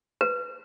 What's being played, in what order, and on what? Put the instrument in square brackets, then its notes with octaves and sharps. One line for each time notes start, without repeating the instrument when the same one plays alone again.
[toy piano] B4